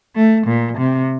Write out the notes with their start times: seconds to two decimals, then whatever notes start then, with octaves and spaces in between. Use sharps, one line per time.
0.16 A3
0.47 A#2
0.78 C3